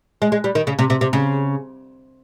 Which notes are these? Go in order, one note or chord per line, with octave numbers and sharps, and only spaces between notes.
G#3
G#3
G3
D#3
C#3
C3
C3
C3
C#3